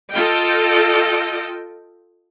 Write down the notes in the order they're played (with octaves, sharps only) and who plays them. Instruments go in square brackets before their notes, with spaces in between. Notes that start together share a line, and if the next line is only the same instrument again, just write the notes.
[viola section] F4 A4 D#5 G5